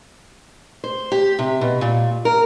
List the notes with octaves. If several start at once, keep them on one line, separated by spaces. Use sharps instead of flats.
C5
G4
C3
B2
A#2
A#4